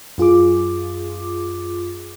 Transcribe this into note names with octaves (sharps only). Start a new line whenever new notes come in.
F#2 F4 G#4 D6